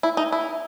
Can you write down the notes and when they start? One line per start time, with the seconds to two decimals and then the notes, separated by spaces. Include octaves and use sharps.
0.03 E4
0.17 D#4
0.32 E4